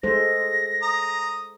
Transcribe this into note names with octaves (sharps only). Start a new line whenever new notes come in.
G#3 A4 C5 A#6
A#5 D#6